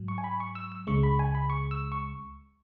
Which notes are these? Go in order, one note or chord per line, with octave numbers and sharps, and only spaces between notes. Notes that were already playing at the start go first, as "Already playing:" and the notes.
Already playing: G#2 F#3
C#6
G#5
B5
C#6
E6
E6
C#2 C#3 G#3 C#6
B5
G#5
B5
C#6
E6
C#6